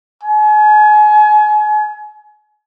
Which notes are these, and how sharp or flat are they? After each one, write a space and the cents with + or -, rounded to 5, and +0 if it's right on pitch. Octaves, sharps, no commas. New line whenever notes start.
G#5 +35